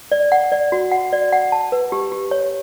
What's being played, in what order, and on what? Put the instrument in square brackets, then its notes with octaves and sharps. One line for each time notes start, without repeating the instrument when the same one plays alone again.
[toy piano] D5
F#5
D5
F#4
F#5
D5
F#5
A5
B4
G4
G4
C#5